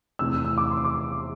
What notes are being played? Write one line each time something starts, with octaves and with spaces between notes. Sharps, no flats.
E2 C3 E3 A3 E6
E6
D6
C6
D6